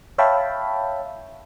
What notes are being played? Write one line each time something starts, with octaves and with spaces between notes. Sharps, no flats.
C#5 E5 F5 G5 A5 B5